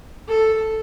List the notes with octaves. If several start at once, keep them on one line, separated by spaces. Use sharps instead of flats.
A4